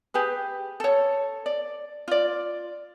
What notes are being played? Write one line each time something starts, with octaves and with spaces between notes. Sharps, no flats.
G4 G#4 B4
A4 C#5
D5
F4 D5